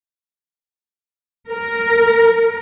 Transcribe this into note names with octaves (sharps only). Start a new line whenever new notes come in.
A#4